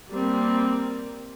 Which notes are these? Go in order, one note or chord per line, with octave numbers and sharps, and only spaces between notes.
G3 A#3 C4